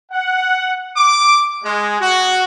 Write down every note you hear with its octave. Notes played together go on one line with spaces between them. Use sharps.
F#5
D6
G#3
F#4